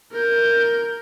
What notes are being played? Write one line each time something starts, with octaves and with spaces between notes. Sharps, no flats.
A#4 G6